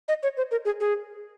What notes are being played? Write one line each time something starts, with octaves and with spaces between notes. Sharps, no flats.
D#5
C#5
C5
A#4
G#4
G#4